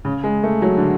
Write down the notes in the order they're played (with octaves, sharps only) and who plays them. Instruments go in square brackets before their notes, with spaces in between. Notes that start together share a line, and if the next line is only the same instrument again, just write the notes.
[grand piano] C#3
G#3
A3
F#3
D3